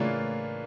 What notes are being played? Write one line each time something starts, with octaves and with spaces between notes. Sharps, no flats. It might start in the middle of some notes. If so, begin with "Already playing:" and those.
Already playing: A2 C#3 E3 A#3 D4 F4 C#5